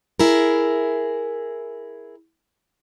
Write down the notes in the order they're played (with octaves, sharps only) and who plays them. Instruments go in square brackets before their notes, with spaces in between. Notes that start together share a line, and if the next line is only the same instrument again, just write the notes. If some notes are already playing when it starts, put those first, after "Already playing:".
[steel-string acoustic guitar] E4 G#4 A#4